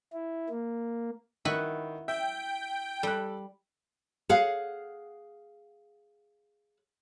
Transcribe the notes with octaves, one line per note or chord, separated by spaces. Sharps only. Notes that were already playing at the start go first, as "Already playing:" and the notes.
E4
A#3
D#3 E4 F#4 B4
E5 G5
G3 A4 F#6
G#4 F5 F#5